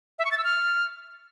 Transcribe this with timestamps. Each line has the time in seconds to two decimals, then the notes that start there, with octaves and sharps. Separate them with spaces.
0.19 E5
0.25 C#6
0.31 A6
0.38 E6
0.44 F6